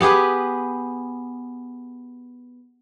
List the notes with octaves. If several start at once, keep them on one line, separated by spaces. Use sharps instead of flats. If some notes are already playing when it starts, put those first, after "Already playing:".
B3 G4 G#4 B4